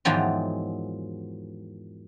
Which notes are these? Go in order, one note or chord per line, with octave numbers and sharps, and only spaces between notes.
E2 G#2 D#3 F3 F#3